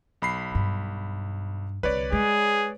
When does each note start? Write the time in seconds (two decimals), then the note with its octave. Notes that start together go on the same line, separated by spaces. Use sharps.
0.22 B1 B5 C7
0.55 G2
1.83 C2 D3 B4 C#5 D5
2.12 G#3 G#4